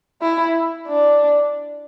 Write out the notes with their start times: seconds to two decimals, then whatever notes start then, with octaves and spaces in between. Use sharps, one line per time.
0.22 E4
0.88 D4